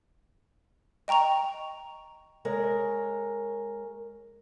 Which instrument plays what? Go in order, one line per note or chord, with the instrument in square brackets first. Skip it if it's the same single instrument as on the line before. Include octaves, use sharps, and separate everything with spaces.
[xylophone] D#5 G5 A#5 C#6 F7
[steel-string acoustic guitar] G#3 A#4 C#5